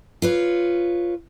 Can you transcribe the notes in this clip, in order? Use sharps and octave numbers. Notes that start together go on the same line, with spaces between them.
F4 B4 C#5